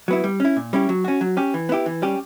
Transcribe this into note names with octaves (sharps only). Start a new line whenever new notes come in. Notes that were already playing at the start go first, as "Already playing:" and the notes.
F#3 B3 E4
G3
C#4 E4
A#2
G3 C#4 E4 G4
F#3
C#4 F#4
F#3
C#4 G4
E3
B3 E4 G4
E3
G3 C#4 G4